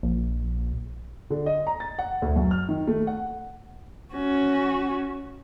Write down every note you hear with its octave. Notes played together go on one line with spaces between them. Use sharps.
A#1
D3
D#5
A#5
A6
F#5
D2
F#2
F6
D#3
A3
F#5
C#4 F#4